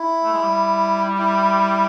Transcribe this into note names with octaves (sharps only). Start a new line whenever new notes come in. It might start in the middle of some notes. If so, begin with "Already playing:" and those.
Already playing: E4
A3
G#3
G3
E4